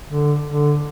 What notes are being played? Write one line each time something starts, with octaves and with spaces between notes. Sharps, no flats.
D3
D3